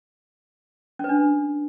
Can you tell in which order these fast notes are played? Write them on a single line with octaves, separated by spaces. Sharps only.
C#4 B4 D4